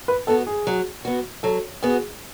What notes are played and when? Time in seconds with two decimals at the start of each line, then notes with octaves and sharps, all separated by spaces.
0.08 B4
0.27 B3 F#4 A4
0.47 G#4
0.67 F#3
1.05 B3 F#4
1.43 F#3 A4
1.83 B3 F#4 G#4